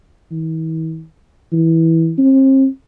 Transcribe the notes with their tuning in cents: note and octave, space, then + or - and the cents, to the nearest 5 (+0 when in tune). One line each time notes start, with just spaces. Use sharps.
E3 -45
E3 -15
C4 +40